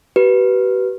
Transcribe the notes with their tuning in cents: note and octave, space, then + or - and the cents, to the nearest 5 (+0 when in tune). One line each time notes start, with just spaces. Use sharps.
G4 -45 B4 -10